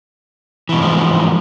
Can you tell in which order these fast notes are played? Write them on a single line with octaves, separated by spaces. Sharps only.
E3 B2 E2 G#2 F3